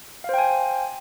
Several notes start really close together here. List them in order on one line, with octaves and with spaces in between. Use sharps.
F5 C5 G5 G#5